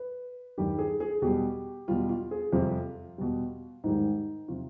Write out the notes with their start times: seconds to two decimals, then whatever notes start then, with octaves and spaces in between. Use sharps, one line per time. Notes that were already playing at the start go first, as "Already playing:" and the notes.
Already playing: B4
0.58 G2 D#3 G3 G4
0.79 G#4
1.00 G#4
1.22 B2 G3 G4
1.88 B2 G3 F4
2.09 F4
2.31 G#4
2.53 F2 C3 G3 F4
3.18 B2 G3
3.84 G#2 D#3 G3 D#4
4.48 C3 F3 F4